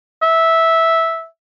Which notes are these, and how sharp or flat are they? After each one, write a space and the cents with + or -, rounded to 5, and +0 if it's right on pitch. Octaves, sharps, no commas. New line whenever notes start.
E5 -10